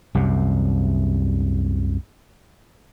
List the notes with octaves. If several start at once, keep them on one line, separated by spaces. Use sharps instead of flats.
C2 F#2 C3